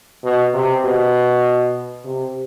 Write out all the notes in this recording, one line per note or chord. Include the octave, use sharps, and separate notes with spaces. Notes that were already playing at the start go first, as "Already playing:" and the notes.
B2
C3
B2
C3